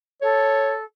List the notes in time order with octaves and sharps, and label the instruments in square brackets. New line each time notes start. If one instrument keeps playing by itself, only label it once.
[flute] A4 [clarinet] C#5